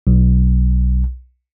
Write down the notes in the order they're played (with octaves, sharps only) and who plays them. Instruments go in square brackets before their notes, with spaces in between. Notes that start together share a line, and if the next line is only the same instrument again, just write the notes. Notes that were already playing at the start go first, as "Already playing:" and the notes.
[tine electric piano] B1